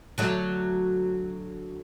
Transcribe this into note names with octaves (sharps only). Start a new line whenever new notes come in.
D3 F#3 A3